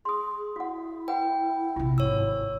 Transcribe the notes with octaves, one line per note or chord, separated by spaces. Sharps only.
G#4 C6 D#6
E4 F#4 F#5
B4 F#5 G5
A#1 C3 F4
G#1 G#2 C#5 E6